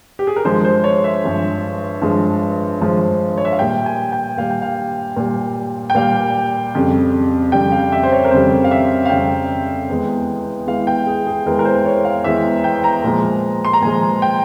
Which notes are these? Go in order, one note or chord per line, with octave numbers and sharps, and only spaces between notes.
G4
G#4
A#4
G2 F3 G#3 C5
C5
C#5
E5
G2 F3 G#3
G2 F3 G#3
G2 F3 G#3
C#5
E5
F5
A#2 G3 G5
G#5
G5
A#2 G3 F5
G5
F5
A#2 G3
G5
A#2 G3 F5
F2 C#3 G3
F2 C#3 G3 G5
F5
E5
C5
C#5
A#4
F2 C#3 G3 C5
F5
E5
F5
F2 C#3 G3 G5
E2 E3 G#3
E2 E3 G#3 F5
G5
G#4
G#4
E2 E3 G#3 A#4
A#4
C5
C#5
F5
E2 E3 G#3 E5
G5
A#5
A#2 F3 G#3
C6
A#5
A#2 F3 G#3 G#5
G5